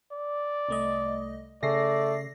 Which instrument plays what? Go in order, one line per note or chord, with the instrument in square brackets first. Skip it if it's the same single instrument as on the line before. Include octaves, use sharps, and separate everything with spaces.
[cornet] D5
[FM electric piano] C2 A3 D#5
[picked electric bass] C#3 [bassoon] A3 [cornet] D5 [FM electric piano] A#6 C7